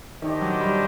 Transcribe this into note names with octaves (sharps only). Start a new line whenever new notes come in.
D#3 A3 D4 G4 C5 D#5
F#3
G3